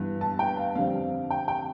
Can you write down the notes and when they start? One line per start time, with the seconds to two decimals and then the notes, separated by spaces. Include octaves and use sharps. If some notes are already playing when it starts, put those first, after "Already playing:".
Already playing: G2 E3 B3
0.21 A5
0.39 G5
0.57 F5
0.75 F2 D3 G3 C4 F5
1.30 G5
1.48 G5